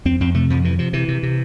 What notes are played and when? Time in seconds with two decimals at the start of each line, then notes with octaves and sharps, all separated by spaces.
0.05 F2 C4
0.20 F2 C4
0.34 C3 A3
0.50 F2 F3
0.64 C3 E3
0.79 C3 F3
0.93 C3 E3
1.08 C3
1.23 C3